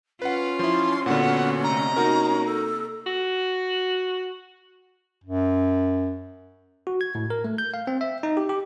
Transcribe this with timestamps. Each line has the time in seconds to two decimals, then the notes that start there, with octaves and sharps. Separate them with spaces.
0.22 C#4 F4 B4 F#5
0.59 F3 E4 C6
1.06 A#2 D3 A#3 B3 F#4 F#5
1.64 C3 A3 D#5 A#5
1.96 A#3 D#4 F#4 A#4
2.46 A4
3.07 F#4
5.24 F#2
6.87 F#4
7.01 G#6
7.15 A2
7.30 A#4
7.44 A3
7.58 G6
7.74 F5
7.87 C4
8.01 E5
8.23 D#4
8.37 G4
8.49 G4